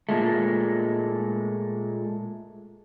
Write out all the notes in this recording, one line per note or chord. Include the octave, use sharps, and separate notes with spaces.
A#2 G#3 A3